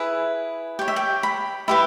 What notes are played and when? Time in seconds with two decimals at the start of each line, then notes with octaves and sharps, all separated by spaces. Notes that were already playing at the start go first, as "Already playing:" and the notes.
Already playing: E4 G#4 B4
0.79 G4 C#5 G5
0.88 E5
0.96 G5
1.23 B5
1.68 E4 G4 B4 B5